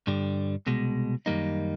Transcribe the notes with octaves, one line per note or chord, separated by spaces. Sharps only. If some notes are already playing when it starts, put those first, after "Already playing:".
G2 D3 G3
C2 B2 G#3
F#2 D#3 G3 A#3 D#4